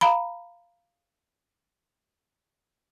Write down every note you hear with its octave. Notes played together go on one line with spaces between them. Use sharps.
F5 A#5 B5